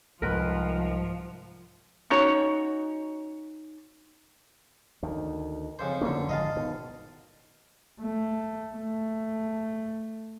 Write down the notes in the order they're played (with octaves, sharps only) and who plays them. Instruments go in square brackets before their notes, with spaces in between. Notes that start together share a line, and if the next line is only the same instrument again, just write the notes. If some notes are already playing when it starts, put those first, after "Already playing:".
[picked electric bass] C2 G#2 [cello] F3 [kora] A#4 B4
[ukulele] C#4 D#4 F#4 C#5
[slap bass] D2 D#3
[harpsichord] F2 C#3 C5
[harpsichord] B1 D3 [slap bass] F2 A#3 C#4
[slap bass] G#1 F2 G#2 [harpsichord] D#5 F5 A5
[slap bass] B2 D#3
[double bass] A3
A3